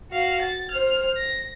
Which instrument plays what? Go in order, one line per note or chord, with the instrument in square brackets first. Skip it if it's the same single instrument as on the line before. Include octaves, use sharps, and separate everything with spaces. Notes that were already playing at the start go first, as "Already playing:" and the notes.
[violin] F#4 F5
A6
C5 F6
A#6